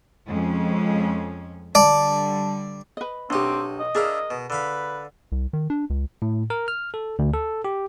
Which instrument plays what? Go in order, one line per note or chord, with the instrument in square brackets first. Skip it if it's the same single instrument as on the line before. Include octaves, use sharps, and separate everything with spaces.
[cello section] F2 G#3 C#4
[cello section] D3 G3 [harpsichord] D5 [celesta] A5
[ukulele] B4 D#5
[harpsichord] B1 D#4 [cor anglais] C4 [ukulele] D4 G4
[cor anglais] D#5
[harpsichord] D4 E4 F5 [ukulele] G#4 A#4
[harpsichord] B2
[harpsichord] D3 F5 B5 [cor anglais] B4
[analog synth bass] C2
D#3
D4
C#2
[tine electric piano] A2
A#4
F6
A4
D2
A4
G4